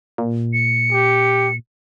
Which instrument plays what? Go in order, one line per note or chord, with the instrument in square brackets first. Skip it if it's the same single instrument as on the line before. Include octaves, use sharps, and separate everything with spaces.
[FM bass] A#2
[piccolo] C#7
[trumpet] G4